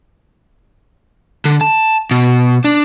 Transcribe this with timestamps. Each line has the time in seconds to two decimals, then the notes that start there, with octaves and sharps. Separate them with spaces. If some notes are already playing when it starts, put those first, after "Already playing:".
1.45 D3
1.61 A5
2.11 B2
2.64 D4